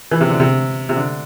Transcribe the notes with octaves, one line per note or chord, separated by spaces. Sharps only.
E3
C3
D3
C3
C3
D3